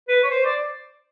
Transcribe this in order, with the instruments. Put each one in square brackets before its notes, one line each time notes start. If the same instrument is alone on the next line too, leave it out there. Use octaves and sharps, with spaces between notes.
[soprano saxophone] B4
C#5
C5
D5